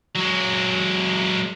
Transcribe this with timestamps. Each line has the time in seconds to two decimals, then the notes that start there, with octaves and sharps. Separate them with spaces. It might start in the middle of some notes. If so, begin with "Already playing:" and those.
0.16 F#3 G#3